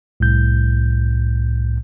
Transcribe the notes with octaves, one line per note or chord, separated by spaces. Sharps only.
C2 A2 G6